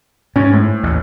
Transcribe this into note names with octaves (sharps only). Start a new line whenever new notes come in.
G#2 C#4
A2
A1 D#2